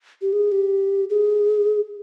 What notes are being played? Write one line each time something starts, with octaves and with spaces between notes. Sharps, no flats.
G4
G#4
G4
G#4